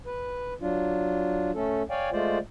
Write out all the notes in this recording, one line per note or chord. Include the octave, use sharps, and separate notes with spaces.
B4
F#3 D4 F4
A3 C#4 A4
C#5 D5 F5 G5 G#5
G#3 A3 F4 C5 D5